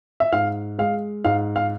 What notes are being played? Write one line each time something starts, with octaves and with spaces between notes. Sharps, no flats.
E5
G#2 F5
G#3 F5
G#2 F5
F5